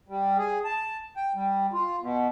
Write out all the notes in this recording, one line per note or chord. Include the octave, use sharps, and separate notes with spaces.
G3
G#4
A5
G5
G3
F4
B2